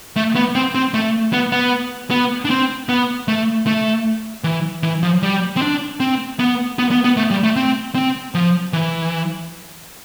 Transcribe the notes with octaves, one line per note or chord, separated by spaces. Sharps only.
A3
B3
C4
C4
A3
B3
B3
B3
D4
C4
B3
A3
A3
E3
E3
F3
G3
C4
D4
C4
B3
B3
B3
B3
A3
G3
A3
C4
C4
F3
E3